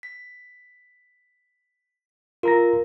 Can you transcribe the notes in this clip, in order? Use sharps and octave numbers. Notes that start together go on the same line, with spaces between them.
B6
F4 A#4 A#5 A#6